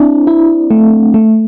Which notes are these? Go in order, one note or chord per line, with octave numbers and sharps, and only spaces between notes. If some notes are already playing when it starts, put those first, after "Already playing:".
Already playing: C4 D4 E4
E4
A3
A3